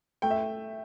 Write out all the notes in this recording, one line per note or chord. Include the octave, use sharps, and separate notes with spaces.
A3 G5
E5